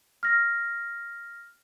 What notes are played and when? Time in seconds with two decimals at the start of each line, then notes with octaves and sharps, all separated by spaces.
0.23 F6 A#6